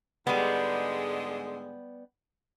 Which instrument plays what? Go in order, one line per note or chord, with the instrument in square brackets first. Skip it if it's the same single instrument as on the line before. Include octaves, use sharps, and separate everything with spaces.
[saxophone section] G#2 D3 G#3 [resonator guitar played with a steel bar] G3 B3